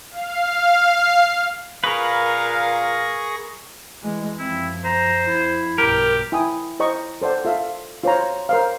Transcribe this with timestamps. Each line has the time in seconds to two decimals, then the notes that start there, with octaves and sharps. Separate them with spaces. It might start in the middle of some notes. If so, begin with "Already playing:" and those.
0.11 F5
1.84 A#2 G#4 A#4 B4 F5 C#6 A#6
4.01 E3 G#3
4.39 F#2 F3 C4 E4
4.84 C5 A#5
5.27 F2 E4
5.78 B1 G2 G4 A#4
6.32 E4 G5 G#5 D#6
6.80 E4 C5 D#5 A#5 C#6
7.22 A4 C5 D5 F#5
7.45 F4 A4 E5 F5
8.03 F4 C5 C#5 A#5
8.49 A#4 C5 F5